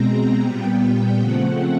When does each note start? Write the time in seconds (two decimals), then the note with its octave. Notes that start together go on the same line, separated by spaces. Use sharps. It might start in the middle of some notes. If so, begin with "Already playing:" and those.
Already playing: B2 G#3 C4 A#5
0.41 A#2 G3 B3 G5
1.19 C#3 F3 A3 C4 F#5